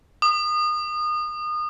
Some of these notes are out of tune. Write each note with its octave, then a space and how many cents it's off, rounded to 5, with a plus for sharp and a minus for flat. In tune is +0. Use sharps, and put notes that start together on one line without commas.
D#6 -30